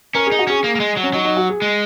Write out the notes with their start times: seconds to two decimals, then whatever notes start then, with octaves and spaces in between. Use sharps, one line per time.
0.15 C#4 A#4
0.27 D#4 G#4
0.39 F#4
0.47 C#4 G#4
0.64 A#3
0.75 A#3
0.80 G#3
0.97 F#3
1.03 C#4
1.13 F#3 D#4
1.25 D#4
1.37 F#4
1.50 G#4
1.62 G#3